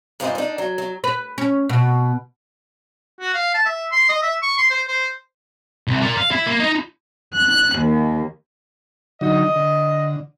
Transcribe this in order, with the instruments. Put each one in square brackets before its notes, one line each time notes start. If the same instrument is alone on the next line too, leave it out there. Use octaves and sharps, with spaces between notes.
[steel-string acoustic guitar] G2 A#2 D4 D#4 C5 D#5
D4 D#4
F#3
F#3
[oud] B4
C#4
B2
[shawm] F#4
F5
A5
E5
C6
D#5
E5
C#6
C6
C5
C5
[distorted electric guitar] C2
A#4 D5
F5
E4
A#3
D#4 D#5
[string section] F#6
D#2
[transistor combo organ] D3 F#3 D#4 [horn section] D#5
[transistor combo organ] D3